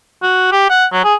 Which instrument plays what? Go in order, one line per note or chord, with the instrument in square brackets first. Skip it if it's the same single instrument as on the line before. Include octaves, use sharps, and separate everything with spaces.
[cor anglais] F#4
G4
F#5
F#3
G#4